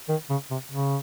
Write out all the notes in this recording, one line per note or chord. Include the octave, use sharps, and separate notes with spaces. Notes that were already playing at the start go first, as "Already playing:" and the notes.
D#3
C#3
C3
C#3